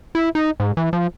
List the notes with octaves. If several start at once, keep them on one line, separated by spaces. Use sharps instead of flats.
E4
D#4
G#2
E3
F3